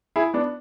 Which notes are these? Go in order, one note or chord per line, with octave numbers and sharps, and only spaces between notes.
E4 G#4
B3 D4